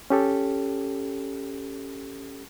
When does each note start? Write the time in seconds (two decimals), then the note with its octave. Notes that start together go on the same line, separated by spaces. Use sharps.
0.10 C#4 G4 A4